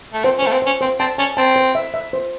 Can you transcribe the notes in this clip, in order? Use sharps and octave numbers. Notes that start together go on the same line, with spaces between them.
A3
C4 C5
C#4
A3 C5
C4
C#4 C5
C4 C5
C4 A5
C#4 A5
C4 A5
C5
E5
E5
C5